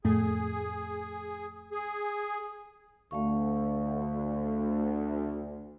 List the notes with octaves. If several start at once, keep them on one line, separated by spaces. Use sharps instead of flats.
F2 A2 A3 G#4
G#4
D2 A3 F5 C#6